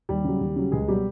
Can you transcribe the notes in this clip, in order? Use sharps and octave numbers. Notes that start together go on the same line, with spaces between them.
D#2 G3 G4
C#3 F#3
D#2
C#3 F#3
C#2 G#3 G#4
B2 F#3 G3 G4